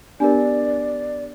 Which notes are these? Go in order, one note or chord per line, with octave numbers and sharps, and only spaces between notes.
B3 D4 G4 A#4 D5